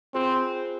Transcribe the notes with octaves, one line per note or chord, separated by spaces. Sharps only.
C4 F4 G#4 C5